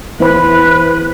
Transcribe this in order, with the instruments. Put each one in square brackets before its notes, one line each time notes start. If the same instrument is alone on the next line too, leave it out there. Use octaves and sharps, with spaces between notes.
[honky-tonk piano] E2 C5 B5 [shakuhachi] B4